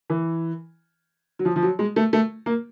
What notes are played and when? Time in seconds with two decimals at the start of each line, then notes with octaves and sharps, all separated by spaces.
0.10 E3
1.39 F#3
1.45 F3
1.56 F3
1.63 F#3
1.79 G#3
1.96 A3
2.13 A3
2.46 A#3